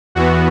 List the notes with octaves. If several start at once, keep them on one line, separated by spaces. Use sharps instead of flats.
E2 E3 B3 F#4